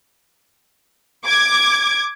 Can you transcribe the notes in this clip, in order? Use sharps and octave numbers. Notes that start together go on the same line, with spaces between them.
D6 G#6